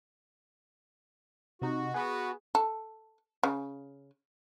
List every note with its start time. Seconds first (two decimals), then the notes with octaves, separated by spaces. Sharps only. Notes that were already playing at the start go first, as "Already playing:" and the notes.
1.62 C3 D#4 F#4
1.94 B3 G#4 B4
2.55 A4
3.43 C#3